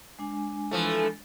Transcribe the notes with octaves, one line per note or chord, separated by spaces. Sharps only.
G#3 D4 G#5
E3 F3 A3